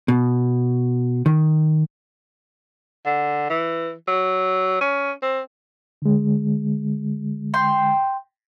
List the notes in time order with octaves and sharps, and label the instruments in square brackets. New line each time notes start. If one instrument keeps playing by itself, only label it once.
[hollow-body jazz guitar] B2
D#3
[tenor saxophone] D3
E3
F#3
C#4
C4
[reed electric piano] D3 G#3
[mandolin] G5 C6